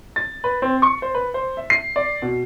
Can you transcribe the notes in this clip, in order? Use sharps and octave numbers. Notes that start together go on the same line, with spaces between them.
A6
B4
C4
C#6
C5
B4
C5
E5
C7
D5
B2